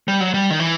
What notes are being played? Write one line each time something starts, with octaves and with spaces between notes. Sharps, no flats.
G3
F#3
G3
D#3
E3